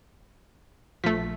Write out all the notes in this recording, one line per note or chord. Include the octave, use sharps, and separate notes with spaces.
A#1 F3 A3 B6